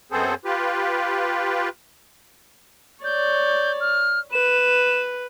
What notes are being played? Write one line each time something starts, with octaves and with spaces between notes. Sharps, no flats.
F#2 B3 C4 G#4 A4 C5
F4 G4 B4
C#5 D5 G6
F6
B4 E7